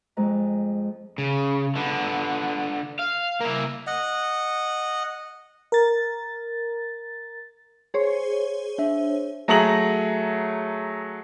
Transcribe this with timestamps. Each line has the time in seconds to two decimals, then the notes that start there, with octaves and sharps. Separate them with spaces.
0.17 F2 G#3 G#4 A#5
1.18 C#3
1.75 D3 B3
2.99 F5
3.41 A#3 E4
3.87 D#5 F#5
5.72 A#4 A6
7.94 G#4 C5 C#5
8.78 D4 E5
9.48 F#3 A3 G#4 A#5 A#6 F#7